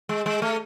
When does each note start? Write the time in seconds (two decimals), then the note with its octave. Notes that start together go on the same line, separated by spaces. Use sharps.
0.09 G#3
0.26 G#3
0.42 A3